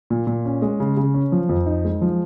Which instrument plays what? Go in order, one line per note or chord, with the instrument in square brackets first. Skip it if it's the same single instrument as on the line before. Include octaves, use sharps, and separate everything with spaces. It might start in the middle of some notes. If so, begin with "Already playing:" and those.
[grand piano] A#2
A#2
C#4
G#3
C#3
C#3
C#4
F3
F2
D#4
G#3
F3